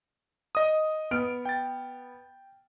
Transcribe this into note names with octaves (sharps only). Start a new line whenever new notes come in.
D#5 D#6
B3 F6 D7
G5 A6